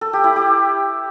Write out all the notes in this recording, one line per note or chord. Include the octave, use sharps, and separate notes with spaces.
A4
G4
E4
G4